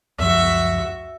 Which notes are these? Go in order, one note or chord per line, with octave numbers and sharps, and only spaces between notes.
C#2 F#2 F3 F#4 E5